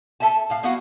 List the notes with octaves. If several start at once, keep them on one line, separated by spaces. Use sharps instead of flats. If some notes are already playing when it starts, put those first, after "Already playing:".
A4 E5 G#5 A5
A2 F5
G3 B3 E4 F#4 F5 F#5